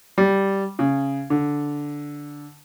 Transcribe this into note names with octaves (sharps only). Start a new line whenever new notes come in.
G3
C#3
D3